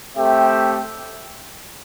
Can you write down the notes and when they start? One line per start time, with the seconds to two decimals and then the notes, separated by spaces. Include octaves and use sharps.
0.15 A3 C4 G4 E5 G5